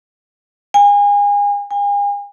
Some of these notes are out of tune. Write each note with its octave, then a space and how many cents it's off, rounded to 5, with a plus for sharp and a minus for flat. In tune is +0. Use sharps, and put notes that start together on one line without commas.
G#5 -30
G#5 -40